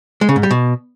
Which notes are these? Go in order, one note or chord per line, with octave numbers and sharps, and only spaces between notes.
G#3
C#3
G#2
G3
B2